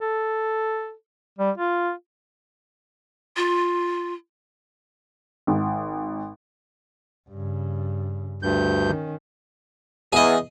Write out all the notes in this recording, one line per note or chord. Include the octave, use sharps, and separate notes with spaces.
A4
G3
F4
F4
G#1
G2 C#3
D2 G2 G6
D#3 C#4
E2 G#4 D#5